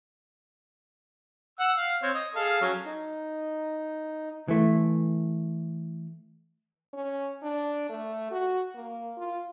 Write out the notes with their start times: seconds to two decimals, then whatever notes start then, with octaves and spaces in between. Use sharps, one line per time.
1.59 F#5 E6
1.77 F5
2.03 C4 C#5
2.14 D#5
2.35 G#4 A4 F5
2.61 F#3 C#4
2.86 D#4
4.48 E3 A3
6.93 C#4
7.43 D4
7.89 A3
8.31 F#4
8.75 A#3
9.17 F4